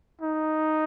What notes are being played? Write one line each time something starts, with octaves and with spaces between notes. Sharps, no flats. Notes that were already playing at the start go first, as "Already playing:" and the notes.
D#4